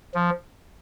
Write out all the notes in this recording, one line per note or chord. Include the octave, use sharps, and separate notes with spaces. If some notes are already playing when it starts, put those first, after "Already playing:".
F3